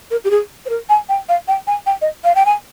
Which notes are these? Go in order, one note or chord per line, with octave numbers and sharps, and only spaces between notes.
A#4
G4
G#4
C5
A#4
G#5
G5
F5
G5
G#5
G5
D#5
F5
G5
G#5